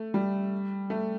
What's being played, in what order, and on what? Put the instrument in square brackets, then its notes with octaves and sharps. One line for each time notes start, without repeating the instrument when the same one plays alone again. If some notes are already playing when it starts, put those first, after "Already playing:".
Already playing: [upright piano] A3
G3
A3